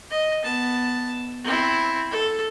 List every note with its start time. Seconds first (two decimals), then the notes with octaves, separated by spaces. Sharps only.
0.10 D#5
0.43 B3 A5
1.44 C4 E4
2.11 A4